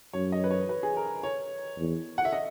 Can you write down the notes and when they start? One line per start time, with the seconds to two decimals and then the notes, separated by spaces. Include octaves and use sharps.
0.13 F#2 C#5
0.32 D#5
0.44 B4
0.51 C#5
0.69 B4
0.83 G#4
0.97 A#4
1.23 C#5
1.78 E2
2.18 F#5
2.25 E5
2.33 D#5